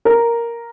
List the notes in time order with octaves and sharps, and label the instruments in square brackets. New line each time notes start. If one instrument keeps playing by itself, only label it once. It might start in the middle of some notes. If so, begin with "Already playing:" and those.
[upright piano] A#4